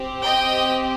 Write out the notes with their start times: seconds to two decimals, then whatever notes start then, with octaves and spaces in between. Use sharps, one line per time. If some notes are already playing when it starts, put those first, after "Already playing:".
Already playing: C4 G4
0.23 D#5 G5